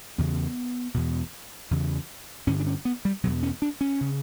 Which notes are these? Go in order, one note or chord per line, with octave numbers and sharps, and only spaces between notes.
E2 C#3 B3
E2 B2
E2 C#3
G2 D3 C#4
D4
C#4
B3
G3
E2 B2 F#3
C#4
D4
C#4
C#3